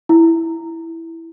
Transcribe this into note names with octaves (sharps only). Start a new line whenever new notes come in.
E4